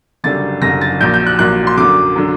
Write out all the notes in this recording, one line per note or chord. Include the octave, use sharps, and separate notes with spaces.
F#1 F#2 D3 G3 A6
F#1 F#2 D3 G3 A#6
A6
A#1 A#2 F#3 G6
G6
F#6
A#1 A#2 F#3 F#6
C6
F#2 D3 F#3 D6
D3 F#3